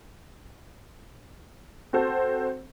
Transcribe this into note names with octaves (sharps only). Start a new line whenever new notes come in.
C4 F#4 A4 C5